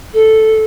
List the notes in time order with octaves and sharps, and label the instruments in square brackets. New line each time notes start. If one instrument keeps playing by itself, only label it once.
[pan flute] A4